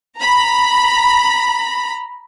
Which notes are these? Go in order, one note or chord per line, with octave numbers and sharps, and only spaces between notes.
A#5 B5